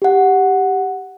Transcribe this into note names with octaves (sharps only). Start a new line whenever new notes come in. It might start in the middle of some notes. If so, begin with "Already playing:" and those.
G4 F#5